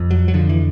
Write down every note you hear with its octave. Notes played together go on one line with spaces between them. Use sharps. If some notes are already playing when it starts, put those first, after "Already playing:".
Already playing: F2
F#3
F#3
D3 F3
E3